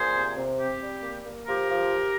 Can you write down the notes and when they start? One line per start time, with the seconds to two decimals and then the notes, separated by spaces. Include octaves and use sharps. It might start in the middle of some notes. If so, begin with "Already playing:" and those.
Already playing: A#2 G#4 C5
0.16 C3
0.37 C3
0.60 C4 G4
0.81 G3
1.03 A#3
1.25 A#3
1.47 F3 G4 A#4
1.69 F3